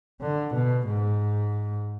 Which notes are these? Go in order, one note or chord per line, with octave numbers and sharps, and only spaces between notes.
D3
B2
G#2